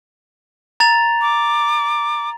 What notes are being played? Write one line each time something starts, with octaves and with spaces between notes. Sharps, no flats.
A#5 A6 F7
D6